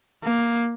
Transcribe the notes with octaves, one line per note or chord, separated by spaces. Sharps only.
A#3